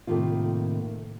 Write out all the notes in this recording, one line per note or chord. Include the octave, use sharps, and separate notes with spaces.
A2 C3 D#3 A#3 F4